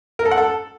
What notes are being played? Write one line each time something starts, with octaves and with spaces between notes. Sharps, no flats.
A#4
A4
F#5
A4